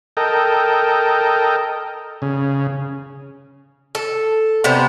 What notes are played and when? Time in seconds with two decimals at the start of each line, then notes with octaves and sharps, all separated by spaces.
0.17 A4 A#4 D#5 G5
2.22 C#3
3.95 A4
4.64 C3 B3 D4 C5